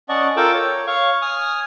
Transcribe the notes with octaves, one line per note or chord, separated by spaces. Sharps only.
C#4 D5 D#5 F#5 A5 C#6
F4 A4 A#4 G5 D6 E6
C#5
C#5 F5 C#6
G#5 D#6 F6